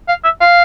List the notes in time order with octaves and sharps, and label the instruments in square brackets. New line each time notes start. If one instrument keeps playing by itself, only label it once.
[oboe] F5
E5
F5